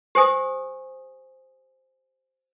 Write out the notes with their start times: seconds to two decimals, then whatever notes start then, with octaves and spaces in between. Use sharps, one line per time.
0.15 G4 C5 G#5 D#6